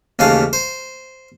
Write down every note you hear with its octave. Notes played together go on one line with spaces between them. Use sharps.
D#2 C#3 E3 A3 F5
C5